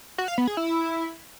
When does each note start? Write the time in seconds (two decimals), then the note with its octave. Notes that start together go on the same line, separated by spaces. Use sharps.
0.18 F#4
0.28 F5
0.38 B3
0.47 G#4
0.57 E4